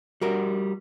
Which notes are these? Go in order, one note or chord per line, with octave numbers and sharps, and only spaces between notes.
G3 F#4 A#4